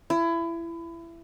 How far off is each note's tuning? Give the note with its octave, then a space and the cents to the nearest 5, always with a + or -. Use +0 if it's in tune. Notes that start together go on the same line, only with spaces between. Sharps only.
E4 +25